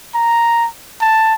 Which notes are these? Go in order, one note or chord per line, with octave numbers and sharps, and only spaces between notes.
A#5
A5